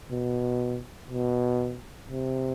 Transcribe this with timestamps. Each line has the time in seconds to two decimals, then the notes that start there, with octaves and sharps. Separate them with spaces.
0.11 B2
1.10 B2
2.09 C3